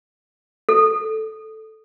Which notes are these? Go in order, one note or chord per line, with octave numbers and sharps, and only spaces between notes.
A4